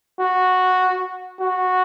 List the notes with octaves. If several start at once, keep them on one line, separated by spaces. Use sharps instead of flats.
F#4
F#4